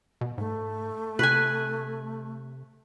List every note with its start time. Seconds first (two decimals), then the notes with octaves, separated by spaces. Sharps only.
0.21 B2
0.38 G#2 A3
1.19 C3 B4 G#5